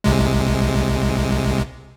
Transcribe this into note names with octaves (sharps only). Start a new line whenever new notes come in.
C2 C3 G#3